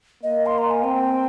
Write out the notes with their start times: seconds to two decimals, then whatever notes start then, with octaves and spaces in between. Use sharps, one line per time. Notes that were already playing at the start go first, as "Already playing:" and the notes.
0.23 A#3 D#5
0.46 C6
0.58 A#5
0.70 G#5
0.83 C4 G5